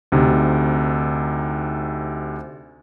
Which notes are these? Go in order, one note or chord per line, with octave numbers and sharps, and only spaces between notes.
D2 C3 D#4